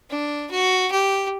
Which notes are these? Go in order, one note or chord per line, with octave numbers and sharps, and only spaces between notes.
D4
F#4
G4